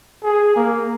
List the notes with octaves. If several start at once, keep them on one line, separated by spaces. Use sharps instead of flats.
G#4
A#3